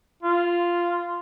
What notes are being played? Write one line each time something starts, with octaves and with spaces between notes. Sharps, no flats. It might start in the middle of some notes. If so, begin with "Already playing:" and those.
F4